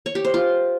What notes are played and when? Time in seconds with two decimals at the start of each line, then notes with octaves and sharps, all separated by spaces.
0.06 C#5
0.15 G4
0.25 C5
0.34 F4